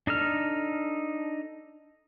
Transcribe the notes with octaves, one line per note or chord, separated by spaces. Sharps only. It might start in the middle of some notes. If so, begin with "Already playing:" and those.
D4 D#4 A4 F6